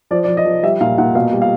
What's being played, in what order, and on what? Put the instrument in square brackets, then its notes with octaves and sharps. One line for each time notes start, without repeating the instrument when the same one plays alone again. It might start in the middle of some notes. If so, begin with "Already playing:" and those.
[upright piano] F3 D5
D5
F3
D#5
F3
G3 E5
A#2 F5
A#2 F#5
B2 F5
G3
F5